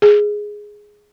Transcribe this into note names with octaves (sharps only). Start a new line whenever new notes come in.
G#4